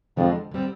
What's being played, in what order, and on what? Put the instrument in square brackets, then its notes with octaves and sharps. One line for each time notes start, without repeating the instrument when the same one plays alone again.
[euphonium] F2 [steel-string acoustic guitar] D3 F3 G#3 D4
[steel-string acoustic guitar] D3 G3 C4